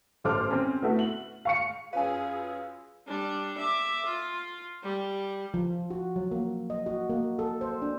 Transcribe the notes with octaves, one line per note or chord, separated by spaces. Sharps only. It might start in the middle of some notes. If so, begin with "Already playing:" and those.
A1 A4 C5 D6 F6
C4 C#4
A3 B3 E4 F#4 A4 E5
F#7
F5 C#6 C#7
F#2 C#4 F4 G#4 B4 F5 G#5
G3 D4
E5 D6
F4
G3
F3
F#4
F#3
A#3
D#5
F#4
A#3
A4
C5
D4